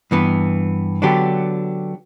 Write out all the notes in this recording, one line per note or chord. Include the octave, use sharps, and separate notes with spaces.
G2 E3 B3
D3 F#3 B3 D4 G4